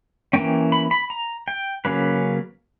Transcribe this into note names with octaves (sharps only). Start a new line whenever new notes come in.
E3 A#3 C#4 G5
B5
B5
A#5
G5
C#3 F#3 A#3 C#4 B4